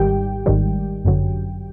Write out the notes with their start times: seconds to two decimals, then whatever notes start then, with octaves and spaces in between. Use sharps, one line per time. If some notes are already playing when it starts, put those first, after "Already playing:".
Already playing: G#1 G#2 D#3 G3 G4 G5
0.46 G#1 G#2 D#3 G3
1.04 G1 F#2 D3 F#3